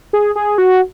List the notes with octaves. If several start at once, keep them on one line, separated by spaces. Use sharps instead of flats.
G#4
G#4
F#4